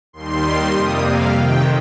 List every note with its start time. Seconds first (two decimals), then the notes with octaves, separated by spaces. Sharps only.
0.13 D#2 D#3 G3 C6
0.72 F2 C3 G3 A#3 D#6
1.01 F5
1.30 F2 C3 D#3 G5